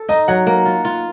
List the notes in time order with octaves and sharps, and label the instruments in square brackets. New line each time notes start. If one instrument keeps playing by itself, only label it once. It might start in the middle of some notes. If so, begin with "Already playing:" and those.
Already playing: [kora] A4
[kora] D#4 [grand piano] D#5
[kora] F#3 [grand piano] F#5
[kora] A#3
F4
F4